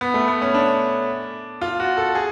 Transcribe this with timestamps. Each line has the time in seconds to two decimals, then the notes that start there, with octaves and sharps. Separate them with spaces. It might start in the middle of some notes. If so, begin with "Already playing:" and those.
0.01 B3
0.14 A3
0.28 B3
0.42 C#4
0.54 D4
1.61 F4
1.80 F#4
1.97 A4
2.15 G#4